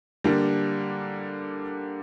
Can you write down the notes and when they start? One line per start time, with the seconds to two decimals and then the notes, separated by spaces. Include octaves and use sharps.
0.24 D3 G3 A#3 D4